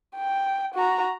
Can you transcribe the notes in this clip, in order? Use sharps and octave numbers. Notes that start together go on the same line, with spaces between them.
G5
F#4 A#5